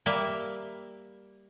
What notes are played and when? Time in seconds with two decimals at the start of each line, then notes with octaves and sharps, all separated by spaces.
0.06 G3 A#3 E5